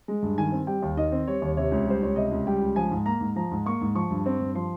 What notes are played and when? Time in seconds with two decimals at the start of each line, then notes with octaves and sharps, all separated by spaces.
0.08 G#3
0.23 G2
0.38 D#3 G#5
0.52 C4
0.67 G3 G5
0.82 D#2
0.97 D#3 D#5
1.12 C4
1.27 G3 C#5
1.42 D#2
1.57 C3 C#5
1.71 C#2
1.86 G3 C5
2.02 C#2 C#5
2.16 C3 D#5
2.31 C#2
2.47 G3 G5
2.62 C#2
2.76 F3 G#5
2.91 G#2
3.06 A#3 A#5
3.21 G#2
3.36 F3 A#5
3.51 G#2
3.66 A#3 C#6
3.81 G#2
3.95 F3 C#6
4.11 G2
4.26 C4
4.40 G2
4.55 F3 C6